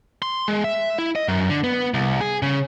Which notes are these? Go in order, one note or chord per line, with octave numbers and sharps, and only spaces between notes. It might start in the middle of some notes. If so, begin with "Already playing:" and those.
C6
G#3
E5
E4
D#5
F#2
D3
B3
C2
G#4
C#3